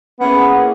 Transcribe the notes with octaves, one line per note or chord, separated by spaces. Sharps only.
A#3 B3 C#4 E4 G#4